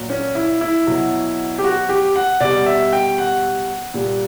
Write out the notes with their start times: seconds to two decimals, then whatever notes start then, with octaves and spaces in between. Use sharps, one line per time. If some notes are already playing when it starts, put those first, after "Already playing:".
Already playing: A#2 F#3
0.10 C#4
0.35 E4
0.61 E4
0.87 B2 F#3
1.59 G4
1.64 F#4
1.89 G4
2.16 F#5
2.40 B2 G3 D5
2.66 E5
2.93 G5
3.18 F#5
3.94 A#2 G3